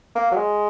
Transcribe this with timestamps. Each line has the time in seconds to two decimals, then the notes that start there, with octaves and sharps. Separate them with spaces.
0.15 A#3
0.32 F#3
0.36 G#3